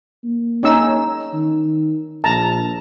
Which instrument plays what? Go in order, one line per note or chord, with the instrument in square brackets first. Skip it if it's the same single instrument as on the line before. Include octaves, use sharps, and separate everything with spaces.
[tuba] A#3
[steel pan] C#4 D#4 E6
[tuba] D#3
[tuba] A#1 [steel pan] A5 A#5